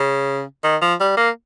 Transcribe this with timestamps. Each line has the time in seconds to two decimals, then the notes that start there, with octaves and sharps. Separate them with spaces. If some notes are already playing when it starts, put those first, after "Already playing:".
Already playing: C#3
0.64 D#3
0.82 F3
1.00 G3
1.17 A#3